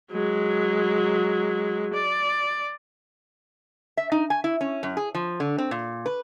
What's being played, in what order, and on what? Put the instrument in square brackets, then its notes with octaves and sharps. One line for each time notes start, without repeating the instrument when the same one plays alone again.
[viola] F#3 G#3
D5
[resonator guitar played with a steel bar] E5
D#4
G#5
E4
C#4
F#2
G#4
F3
D3
C4
A#2
B4